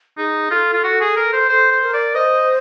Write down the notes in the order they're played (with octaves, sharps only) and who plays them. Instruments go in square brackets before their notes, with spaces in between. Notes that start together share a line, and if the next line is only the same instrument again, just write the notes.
[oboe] D#4 [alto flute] G#4
[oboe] F4 [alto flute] A4
[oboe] F4
F#4
G#4
A#4
C5
[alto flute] A4 [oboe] C5
[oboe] C5
[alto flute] A#4
[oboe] D5
[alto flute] C5 [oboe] D#5